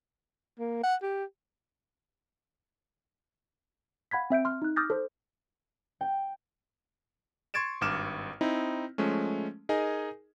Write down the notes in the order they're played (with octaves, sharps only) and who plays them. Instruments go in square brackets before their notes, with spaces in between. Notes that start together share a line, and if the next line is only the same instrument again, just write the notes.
[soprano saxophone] A#3
F#5
G4
[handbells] F5 F#5 B5 G#6 B6
C4 E5 G6 D7
C6 F6
D#4 F#6
D6 D#6 F6 G6 A6 A#6
A4 C5
[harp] G5
[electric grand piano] C6 C#6 G#6 A6 D7 E7
G#1 G2 D6 F6 E7
C4 D#4 E4
F3 G#3 A3 C#4
D#4 G#4 A#4 D#5 G#5